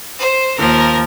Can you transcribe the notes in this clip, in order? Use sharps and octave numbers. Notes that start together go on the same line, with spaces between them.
C5
D#2 F3 A#4